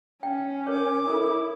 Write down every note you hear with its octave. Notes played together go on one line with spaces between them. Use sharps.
C#4 G5
A#4 C#5 D6
E4 A4 A#4 D#6